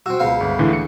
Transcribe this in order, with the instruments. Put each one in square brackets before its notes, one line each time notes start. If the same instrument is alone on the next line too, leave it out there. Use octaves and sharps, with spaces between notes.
[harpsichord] C4 F#4 [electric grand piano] E6
[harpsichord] C#2 B3 F5
[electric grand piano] G1
A2 D3 E3
C#7